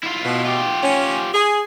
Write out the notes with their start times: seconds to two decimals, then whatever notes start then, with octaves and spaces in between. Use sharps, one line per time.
0.03 E4 F4
0.25 B2
0.45 F4 G4
0.83 C#4
1.34 G#4